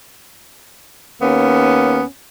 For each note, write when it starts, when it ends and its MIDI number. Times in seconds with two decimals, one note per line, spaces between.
1.21 2.03 39
1.21 2.03 58
1.21 2.03 59
1.21 2.03 61